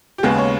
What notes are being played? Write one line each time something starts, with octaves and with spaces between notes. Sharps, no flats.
G4
D#2 C#3 G#3 B3 G#4
C#5